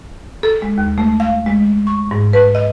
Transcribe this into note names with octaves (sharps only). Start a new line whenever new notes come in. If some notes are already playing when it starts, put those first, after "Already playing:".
A4
G#3
D#2
A3
F5
G#3
C#6
G#2
B4
D#5